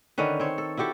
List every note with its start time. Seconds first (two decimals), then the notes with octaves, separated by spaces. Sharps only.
0.18 D3 D#3 C#4 B4
0.40 C4 C#5
0.58 A4
0.77 E4 F#4 G4 A4